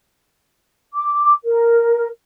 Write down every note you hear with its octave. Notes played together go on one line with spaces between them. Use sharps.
D6
A#4